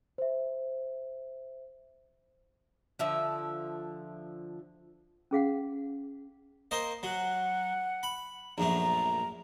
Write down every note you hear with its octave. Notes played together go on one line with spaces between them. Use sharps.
C5 E5
D3 F3 E5
C#4 G#4 F5 F#5
A#3 C5 D#5
F#3 F#5
B5
A#1 F#2 A3 A#5